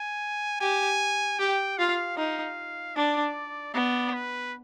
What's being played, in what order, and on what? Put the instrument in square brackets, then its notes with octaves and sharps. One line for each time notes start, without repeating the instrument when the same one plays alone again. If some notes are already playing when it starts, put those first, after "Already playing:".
Already playing: [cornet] G#5
[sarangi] G4 [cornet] G#5
[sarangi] G4 [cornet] G5
[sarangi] F4 [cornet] F5
[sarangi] D#4 [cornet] F5
[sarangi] D4 [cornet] D5
[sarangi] B3 [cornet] D5
[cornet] B4